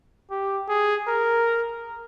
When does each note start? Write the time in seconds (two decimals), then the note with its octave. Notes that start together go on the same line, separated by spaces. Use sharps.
0.31 G4
0.69 G#4
1.08 A#4